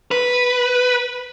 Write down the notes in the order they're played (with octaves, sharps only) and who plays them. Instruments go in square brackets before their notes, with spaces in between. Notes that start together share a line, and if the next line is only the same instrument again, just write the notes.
[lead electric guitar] B4